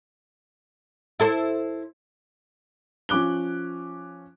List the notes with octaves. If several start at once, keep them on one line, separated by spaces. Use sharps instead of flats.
E4 A4 C5
F3 C#4 D6 F#6 G7